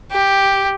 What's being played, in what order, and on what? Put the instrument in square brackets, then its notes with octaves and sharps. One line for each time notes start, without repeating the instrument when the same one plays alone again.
[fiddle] G4